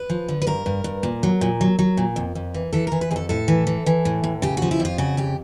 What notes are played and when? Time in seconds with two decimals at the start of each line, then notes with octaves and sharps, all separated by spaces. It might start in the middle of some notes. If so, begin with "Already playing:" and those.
Already playing: B4
0.10 F3
0.29 D3
0.42 B4
0.47 G2 A#4
0.66 G2
0.84 G2
1.03 A#2
1.23 F#3
1.41 A#2
1.61 F#3
1.79 F#3
1.97 A#2
2.16 F2
2.35 F2
2.54 E3
2.73 E3 A4
2.87 E3 A#4
3.01 B4
3.11 F2 G#4
3.16 A4
3.29 A2 A4
3.48 E3
3.67 E3
3.86 E3
4.05 A2
4.24 A2
4.42 C#3 G4
4.57 F3 F#4
4.71 E4
4.80 F2
4.85 F4
4.98 C#3 F#4
5.17 F2 G4